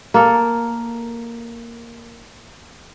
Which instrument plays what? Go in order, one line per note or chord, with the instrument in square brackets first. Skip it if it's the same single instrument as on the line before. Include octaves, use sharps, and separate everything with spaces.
[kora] A#3 A4